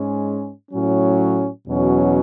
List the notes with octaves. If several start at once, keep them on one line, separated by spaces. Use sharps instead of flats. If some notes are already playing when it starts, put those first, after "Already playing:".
Already playing: G#2 G#3 C#4
A2 F#3 C#4
E2 B2 F#3 C#4